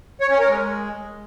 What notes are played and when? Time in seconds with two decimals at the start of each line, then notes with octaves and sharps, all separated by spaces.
0.21 C#5
0.30 C#4
0.39 A#4
0.48 G#3